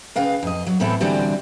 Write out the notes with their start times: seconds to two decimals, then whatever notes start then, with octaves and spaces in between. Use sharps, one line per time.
0.16 C#3 B4 F5 G5
0.43 F2 D#5
0.67 F#3
0.80 A2 E3 B3 C4 E4 A4
1.00 D3 E3 G3 C4 F#4